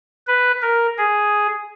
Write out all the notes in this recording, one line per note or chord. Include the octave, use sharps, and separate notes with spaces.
B4
A#4
G#4